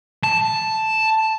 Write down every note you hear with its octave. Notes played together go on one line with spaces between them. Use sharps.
A5